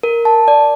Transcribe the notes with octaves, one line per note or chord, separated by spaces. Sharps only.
A#4
A5
D5